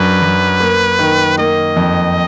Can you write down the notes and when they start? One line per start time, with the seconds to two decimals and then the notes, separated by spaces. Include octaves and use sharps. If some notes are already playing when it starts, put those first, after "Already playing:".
Already playing: F#2 D4 B4
0.22 F#2
0.60 A#3
0.99 D#3
1.38 A#3 D#5
1.76 F2